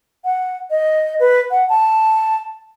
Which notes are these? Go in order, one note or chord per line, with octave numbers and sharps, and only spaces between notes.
F#5
D#5
B4
F#5
A5